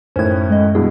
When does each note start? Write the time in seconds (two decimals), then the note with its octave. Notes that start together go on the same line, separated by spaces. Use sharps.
0.16 F#2 A2 D#3 C#4 C5 G#6
0.50 G#3 D#5
0.75 G2 B2 E4 G#4